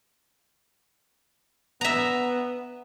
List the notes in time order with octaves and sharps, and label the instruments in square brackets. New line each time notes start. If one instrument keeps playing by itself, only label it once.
[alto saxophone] B3 [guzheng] E5 A#5